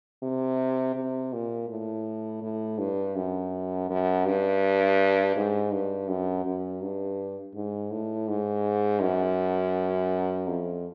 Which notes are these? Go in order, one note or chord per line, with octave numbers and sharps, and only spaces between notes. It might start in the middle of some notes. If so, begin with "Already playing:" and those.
C3
C3
A#2
A2
A2
G2
F#2
F#2
G2
G#2
G2
F#2
F#2
G2
G#2
A2
G#2
F#2
F2